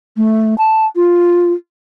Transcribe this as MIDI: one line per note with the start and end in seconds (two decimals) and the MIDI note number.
0.17 0.55 57
0.58 0.85 81
0.96 1.52 65